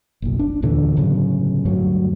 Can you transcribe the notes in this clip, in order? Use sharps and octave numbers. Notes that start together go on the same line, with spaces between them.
F#1 B1
D4
D#2 A#2 D3 E3
G1 A2 C#3 F#3
D2 G2 F#3